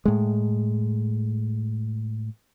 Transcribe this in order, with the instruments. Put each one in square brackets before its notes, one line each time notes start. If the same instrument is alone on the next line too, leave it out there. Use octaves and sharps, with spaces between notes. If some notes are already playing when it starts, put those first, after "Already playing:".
[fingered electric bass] A2 G#3